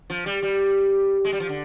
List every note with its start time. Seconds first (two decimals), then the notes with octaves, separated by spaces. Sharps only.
0.10 F3
0.26 G3
0.42 G3
1.25 G#3
1.32 G3
1.40 F3
1.49 D3